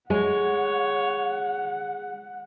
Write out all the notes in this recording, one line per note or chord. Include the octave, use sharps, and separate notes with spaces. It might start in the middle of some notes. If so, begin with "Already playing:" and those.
G#3 C#5 F#5